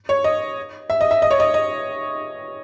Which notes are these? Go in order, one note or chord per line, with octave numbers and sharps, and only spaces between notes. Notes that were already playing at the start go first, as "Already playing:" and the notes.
C#5
D#5
E5
D#5
E5
D#5
C#5
D#5
D#5